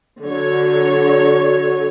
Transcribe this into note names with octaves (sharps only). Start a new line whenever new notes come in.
D3 F#3 C#5